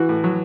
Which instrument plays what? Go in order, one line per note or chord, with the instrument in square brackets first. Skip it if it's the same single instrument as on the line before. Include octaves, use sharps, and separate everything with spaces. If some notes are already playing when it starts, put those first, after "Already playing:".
Already playing: [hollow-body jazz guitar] E3 [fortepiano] F#4
[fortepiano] A2
F#3